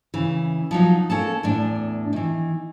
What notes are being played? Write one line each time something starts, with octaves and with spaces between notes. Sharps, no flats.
C#3 E3
F3 F#3 D#4
A#3 C#4 A4 A5
E2 A2 D4
D#3 E3